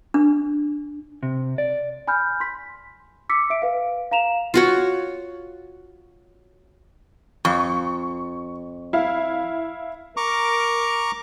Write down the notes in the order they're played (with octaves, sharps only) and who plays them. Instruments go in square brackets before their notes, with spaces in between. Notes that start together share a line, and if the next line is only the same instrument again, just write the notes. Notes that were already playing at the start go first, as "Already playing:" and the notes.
[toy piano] D4
[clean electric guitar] C3
D5
[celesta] G#5 B5 F6 G6
C6 B6
D6 E6 B6 C#7
E5 D7
B4 F5
F5 A#5 E7 F7
[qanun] F4 F#4 C#5
[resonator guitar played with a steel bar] F2 [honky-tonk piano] C#6
[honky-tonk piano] E4 F5
[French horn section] A#4 [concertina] A#5 C#6 D6